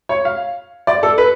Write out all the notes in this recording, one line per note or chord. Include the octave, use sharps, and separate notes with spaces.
C#5
F5
D5
A4
B4